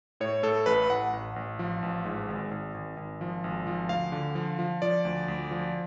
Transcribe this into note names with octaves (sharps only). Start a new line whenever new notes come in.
A2 C#5
A2 A4
A1 B4
A1 F#5
A1
A1
F3
A1
G#2
G#1
G#1
G#1
G#1
F3
G#1
F3
D2 F5
D3
F3
F3
F3 D5
D2
D2
F3